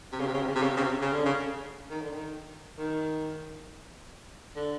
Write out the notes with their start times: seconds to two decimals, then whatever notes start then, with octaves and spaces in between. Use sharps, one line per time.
0.13 C3
0.20 C#3
0.27 C3
0.34 C#3
0.42 C3
0.48 C#3
0.56 C3
0.63 C#3
0.70 C3
0.77 C#3
0.84 C3
1.02 C#3
1.13 D3
1.26 C#3
1.90 D#3
2.02 D3
2.12 D#3
2.79 D#3
4.56 D3